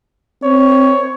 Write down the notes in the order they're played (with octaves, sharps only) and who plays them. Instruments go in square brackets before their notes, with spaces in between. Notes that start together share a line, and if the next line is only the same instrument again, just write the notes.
[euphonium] C4 [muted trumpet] C#5